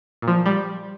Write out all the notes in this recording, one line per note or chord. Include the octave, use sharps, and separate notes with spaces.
A#2
F3
G3